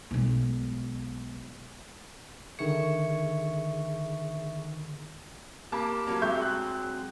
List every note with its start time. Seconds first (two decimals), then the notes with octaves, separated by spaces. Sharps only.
0.11 B1 G#3
2.59 D3 D#3 G#4 E5 C#6 C#7
5.72 A#3 G4 A5 B5 D6
6.07 D2 F#3 A#3 F5
6.22 G#3 C4 E5 C#6 G6
6.42 F#6